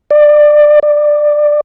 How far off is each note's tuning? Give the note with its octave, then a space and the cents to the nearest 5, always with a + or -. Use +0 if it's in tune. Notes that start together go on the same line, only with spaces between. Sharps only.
D5 +20
D5 +15